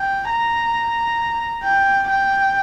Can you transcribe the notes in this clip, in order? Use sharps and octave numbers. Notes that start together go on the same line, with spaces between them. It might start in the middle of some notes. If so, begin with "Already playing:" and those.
Already playing: G5
A#5
G5
G5